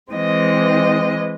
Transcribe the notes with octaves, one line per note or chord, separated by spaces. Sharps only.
E3 G#3 C4 D#5